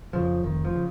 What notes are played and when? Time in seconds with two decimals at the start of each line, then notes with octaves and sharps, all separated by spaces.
0.13 F2 C#3 F3
0.43 F1 D#3
0.65 F3
0.75 C#3